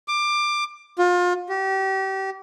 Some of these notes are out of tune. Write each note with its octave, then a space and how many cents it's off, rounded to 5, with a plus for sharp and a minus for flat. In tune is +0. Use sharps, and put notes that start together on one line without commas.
D6 +20
F4 +30
G4 -30